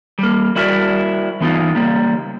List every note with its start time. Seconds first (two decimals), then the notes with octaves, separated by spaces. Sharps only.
0.19 G3 A#3
0.56 G3 E4 F#4 A#4 D5 E5
1.41 E3 B3 D#4 F4
1.75 C#2 G3 A#3